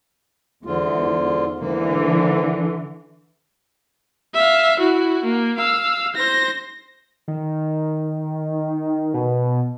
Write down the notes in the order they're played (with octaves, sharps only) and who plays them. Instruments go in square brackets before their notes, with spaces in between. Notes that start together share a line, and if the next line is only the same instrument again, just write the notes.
[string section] E2 [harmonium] G#2 D3 F4
[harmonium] G#2 A#3 [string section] D3 E3
[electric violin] E5 F5
E4 F#4
A#3
F5 E6
C5 A#6
[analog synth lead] D#3
B2